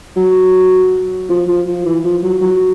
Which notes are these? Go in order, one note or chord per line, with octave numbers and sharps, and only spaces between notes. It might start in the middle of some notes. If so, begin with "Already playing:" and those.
F#3
F3
F3
F3
E3
F3
F#3
F#3